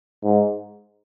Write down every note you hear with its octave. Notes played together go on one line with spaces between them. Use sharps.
G#2